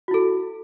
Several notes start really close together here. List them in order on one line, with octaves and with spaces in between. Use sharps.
F#4 E4 A4